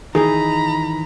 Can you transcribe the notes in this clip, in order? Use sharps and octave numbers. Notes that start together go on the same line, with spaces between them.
D#3 E3 D#4 G#4 A#5 B5